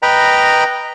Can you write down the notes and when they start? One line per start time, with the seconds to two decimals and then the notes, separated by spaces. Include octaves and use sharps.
0.02 B4 D#5 G5 A#5 B5